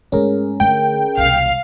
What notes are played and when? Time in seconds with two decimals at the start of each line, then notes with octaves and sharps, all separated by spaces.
0.12 G#2 A3 C#4 G#4 A#4
0.60 D3 A3 G5
1.18 E1 C2 F5